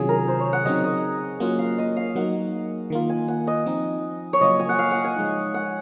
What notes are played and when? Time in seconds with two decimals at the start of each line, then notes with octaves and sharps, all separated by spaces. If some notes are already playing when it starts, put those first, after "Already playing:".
Already playing: C3 D#3 F#3 C#4 F4 G#4
0.09 A#4
0.28 C5
0.40 C#5
0.53 F#5
0.65 C#3 F#3 C4 D#4 D#5
0.84 D#5
1.40 F#3 A#3 C#4 F4 F#5
1.59 F5
1.78 D#5
1.97 F5
2.15 F#3 A#3 D#4 F#5
2.90 D#3 A#3 F4
3.10 G#5
3.28 F#5
3.47 D#5
3.66 F3 C4 D#4
4.33 C#5
4.41 C#3 F#3 A#3 F4 D#5
4.59 G#5
4.69 F#5
4.79 F5
4.91 F#5
5.04 G#5
5.16 F3 G#3 D#4
5.54 F#5